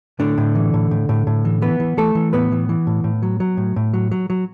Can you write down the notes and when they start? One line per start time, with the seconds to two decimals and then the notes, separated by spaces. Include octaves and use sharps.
0.19 A2 D3 D4
0.38 A2
0.55 E3
0.74 A2
0.91 A2
1.09 A2
1.27 A2
1.45 E3
1.62 E3 B3 B4
1.80 E3
1.97 E3 A3 A4
2.15 E3
2.33 A2 B3 B4
2.52 E3
2.69 E3
2.87 A2
3.04 A2
3.22 F#3
3.40 F#3
3.57 A2
3.76 A2
3.94 F#3
4.11 F#3
4.30 F#3